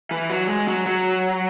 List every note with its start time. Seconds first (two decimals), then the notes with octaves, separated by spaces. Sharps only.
0.11 E3
0.30 F#3
0.49 G#3
0.68 F#3
0.87 F#3